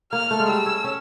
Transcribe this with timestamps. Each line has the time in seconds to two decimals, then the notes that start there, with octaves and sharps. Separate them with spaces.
0.12 A#3 F6
0.31 A3
0.40 G#3
0.48 G3 E6
0.66 C#4
0.84 C#4